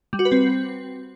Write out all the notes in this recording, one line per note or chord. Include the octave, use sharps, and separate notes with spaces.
G3
F#4
B4
C4